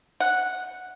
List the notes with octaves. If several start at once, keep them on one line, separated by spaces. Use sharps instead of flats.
F#5